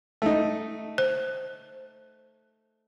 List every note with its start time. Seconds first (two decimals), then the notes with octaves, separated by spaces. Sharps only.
0.22 A3 D#4
0.98 C5